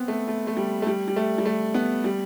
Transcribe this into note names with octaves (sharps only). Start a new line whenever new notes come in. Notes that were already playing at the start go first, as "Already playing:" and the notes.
Already playing: B3 C4
A3
A3
A3
G3
A3
G3
G3
A3
G3
A3
B3
G3